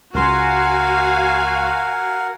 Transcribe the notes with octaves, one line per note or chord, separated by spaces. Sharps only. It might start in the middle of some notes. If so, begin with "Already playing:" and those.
C#2 F#4 A#4 F5 F#5 G#5 C6